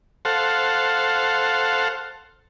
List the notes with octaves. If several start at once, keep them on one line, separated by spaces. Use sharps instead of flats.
A4 C5 F5 F#5